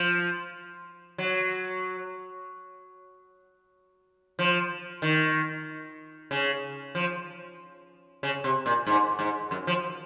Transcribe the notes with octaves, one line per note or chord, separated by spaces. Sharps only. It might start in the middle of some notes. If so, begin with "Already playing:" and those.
Already playing: F3
F#3
F3
D#3
C#3
F3
C#3
C3
A#2
G#2
G#2
F#2
F3